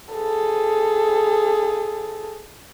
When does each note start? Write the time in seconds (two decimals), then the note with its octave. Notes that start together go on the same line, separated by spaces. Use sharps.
0.14 G#4 A4